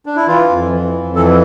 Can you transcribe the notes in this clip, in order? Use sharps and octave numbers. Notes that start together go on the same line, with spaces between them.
D4
E4
E3 F4
F2
E3
F2
E3 A4